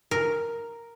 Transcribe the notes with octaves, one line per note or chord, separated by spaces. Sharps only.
A#4